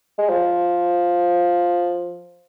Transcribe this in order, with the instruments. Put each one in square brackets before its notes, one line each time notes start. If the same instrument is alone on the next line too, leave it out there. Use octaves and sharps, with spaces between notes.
[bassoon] G#3
F3